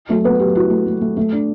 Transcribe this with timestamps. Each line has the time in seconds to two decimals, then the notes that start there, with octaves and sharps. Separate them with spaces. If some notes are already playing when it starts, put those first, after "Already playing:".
0.09 F#3 A3 A4
0.24 A3 B3 B4
0.40 F#3 G4
0.55 E4 F#4
0.70 A3
0.86 A3
1.01 A3
1.17 A3
1.32 D4